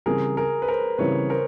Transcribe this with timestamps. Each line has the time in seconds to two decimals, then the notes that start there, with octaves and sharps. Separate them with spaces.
0.06 C#3 E3 G3 C4 G#4 A#4
0.37 G#4 A#4
0.62 B4
0.68 A#4 C5
0.98 C#3 E3 G3 C4 B4 C#5
1.29 A#4 C5